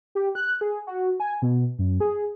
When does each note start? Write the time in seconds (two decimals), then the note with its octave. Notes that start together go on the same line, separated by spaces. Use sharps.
0.15 G4
0.35 F#6
0.61 G#4
0.87 F#4
1.20 G#5
1.42 B2
1.79 F#2
2.00 G#4